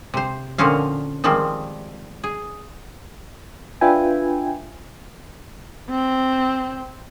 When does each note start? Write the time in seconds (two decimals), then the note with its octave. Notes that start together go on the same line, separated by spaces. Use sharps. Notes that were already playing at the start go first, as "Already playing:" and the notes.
0.14 C3 C5
0.58 A#2 D3 F3 C4 C#4 F5
1.24 D#3 F3 G3 G#3 C4
2.24 G#4
3.81 D4 F4 B4 E5 G5 G#5
5.90 C4